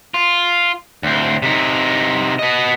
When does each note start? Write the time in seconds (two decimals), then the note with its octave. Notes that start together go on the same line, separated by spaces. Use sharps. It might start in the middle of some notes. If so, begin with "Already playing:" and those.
0.14 F4
1.03 D2 C4
1.42 C3 D#4
2.39 B3 D#5